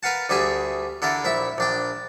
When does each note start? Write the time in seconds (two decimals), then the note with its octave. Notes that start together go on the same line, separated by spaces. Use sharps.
0.03 A#4 B4 F5 F#5 A5
0.29 D2 G3 G#4 E5 G#5
1.02 D3 E4 A4 A#4
1.25 A#1 E4 E5 B5
1.58 A#1 D4 G5